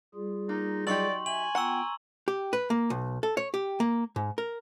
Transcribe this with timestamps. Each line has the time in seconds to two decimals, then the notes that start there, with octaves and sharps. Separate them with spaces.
0.15 G3 F4 G#4
0.49 A#3 D#4
0.87 F#3 D#4 G4 D5 C6 C#6 F#7
1.26 E5 G#5 F#7
1.55 B3 F4 F#5 G5 A#5 C#6 E6
2.28 G4
2.53 B4
2.70 A#3
2.90 B1
3.23 A4
3.37 C#5
3.54 G4
3.80 A#3
4.16 G#2
4.38 A#4